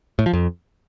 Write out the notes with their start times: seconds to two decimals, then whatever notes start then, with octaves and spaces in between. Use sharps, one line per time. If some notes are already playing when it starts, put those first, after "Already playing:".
0.19 A2
0.26 F3
0.33 F2